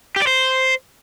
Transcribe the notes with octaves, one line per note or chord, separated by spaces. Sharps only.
G4
D5
C5